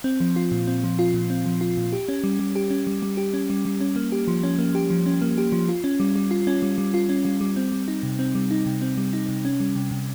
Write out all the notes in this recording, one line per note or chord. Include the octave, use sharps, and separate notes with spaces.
C4
F3
F4
A#2
C4
F3
F4
A#2
C4
F3
F4
A#2
G4
C#4
G3
G3
G4
C#4
G3
G3
G4
C#4
G3
G3
C#4
A#3
G4
F3
C#4
A#3
G4
F3
C#4
A#3
G4
F3
F4
C#4
G3
G3
F4
C#4
G3
G3
F4
C#4
G3
G3
C4
G3
D#4
C3
C4
G3
D#4
C3
C4
G3
D#4
C3
C#4
G3
C3
C3